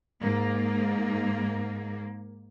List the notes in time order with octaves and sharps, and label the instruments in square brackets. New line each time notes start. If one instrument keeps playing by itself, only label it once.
[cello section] G#2 A#3